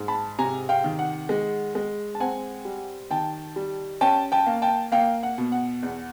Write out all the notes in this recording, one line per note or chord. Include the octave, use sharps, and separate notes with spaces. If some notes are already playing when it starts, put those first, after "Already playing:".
Already playing: G#2
A5 B5
C3 G#5 A#5
F5 G5
D#3
F#5
G#3
G#3
A5
C4 F#5 G#5
G3
D#3 G5 A5
G3
C#4 G5 A5
G5 A5
A#3
G5 A5
A#3 F5 G5
F#5
B2
F#5
E2